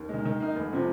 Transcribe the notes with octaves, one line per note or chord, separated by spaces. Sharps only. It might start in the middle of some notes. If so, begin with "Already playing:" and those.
Already playing: D#2
D#3 G#3
D#3
A#3 D#4
F1
C3 F3